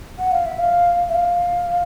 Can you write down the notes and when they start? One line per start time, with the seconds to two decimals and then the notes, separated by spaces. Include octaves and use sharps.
0.19 F#5
0.32 F5
0.46 E5
0.59 F5
1.09 E5
1.15 F5